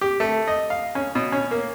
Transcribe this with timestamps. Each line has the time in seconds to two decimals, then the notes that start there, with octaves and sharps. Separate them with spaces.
0.01 G4
0.20 A3
0.48 D#5
0.70 F5
0.95 C#4
1.15 B2
1.32 C#4
1.51 A#3